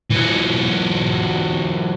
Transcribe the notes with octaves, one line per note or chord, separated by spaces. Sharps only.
E3 F#3